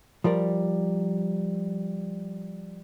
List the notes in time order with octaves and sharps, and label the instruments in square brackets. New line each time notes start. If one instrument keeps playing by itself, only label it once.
[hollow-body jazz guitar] F3 G3 A#4 D5